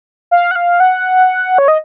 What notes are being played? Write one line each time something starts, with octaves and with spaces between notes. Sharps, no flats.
F5
F#5
F5
F#5
C#5
D#5